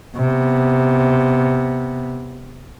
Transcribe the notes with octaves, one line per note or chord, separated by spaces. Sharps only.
C3 B3